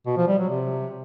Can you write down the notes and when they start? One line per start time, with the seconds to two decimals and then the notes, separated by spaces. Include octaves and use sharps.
0.06 B2
0.17 F3
0.28 G3
0.38 F#3
0.49 C3